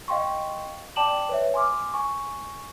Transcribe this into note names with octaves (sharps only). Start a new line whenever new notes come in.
D#5 F5 G5 C6 C#6
D5 G5 A5 D6 E7 F#7
B4 C#5 E5
G#5 C6 D6 F6
G#5 C#6